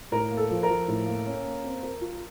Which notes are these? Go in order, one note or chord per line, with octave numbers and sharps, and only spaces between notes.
A2 A#4
A#3
A4
F3
A#4
F3
A2
A#3
C#4
A#3
C4
A#4
F4